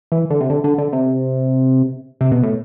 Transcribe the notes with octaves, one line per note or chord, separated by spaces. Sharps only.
E3
D3
C3
D3
D3
D3
C3
C3
B2
A2